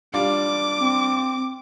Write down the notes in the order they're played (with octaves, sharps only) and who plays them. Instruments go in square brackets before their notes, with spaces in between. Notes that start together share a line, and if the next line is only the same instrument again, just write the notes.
[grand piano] G3 D4 F4 [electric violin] D6
[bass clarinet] C4